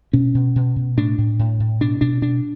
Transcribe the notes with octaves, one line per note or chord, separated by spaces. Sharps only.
B2 C#4
B2
B2
B2
A2 D4
A2
A2
A2
B2 D4
B2 D4
B2 D4